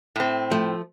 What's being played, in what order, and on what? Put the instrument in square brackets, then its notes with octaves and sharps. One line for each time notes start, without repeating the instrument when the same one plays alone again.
[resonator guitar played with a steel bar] A2 C4
[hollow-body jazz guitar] F3 A3